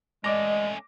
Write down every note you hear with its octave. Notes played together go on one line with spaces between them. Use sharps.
G#3 A3 C#4 D5 D#5 D6 A#6